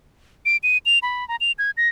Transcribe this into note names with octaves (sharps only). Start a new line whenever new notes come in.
D7
D#7
F7
B5
A#5
F7
G#6
A#6